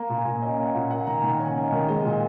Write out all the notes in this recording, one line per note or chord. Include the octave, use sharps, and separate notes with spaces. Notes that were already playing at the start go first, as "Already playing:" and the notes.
Already playing: A#3 A#5
A#2
G#5
A#2
C#4 D#5
A#3
F#5
A#2
A#3 F#5
D#3 A#5
G#5
D#3
C#4 G#5
A#3
D#5
D#3
G#3 D#5
A#2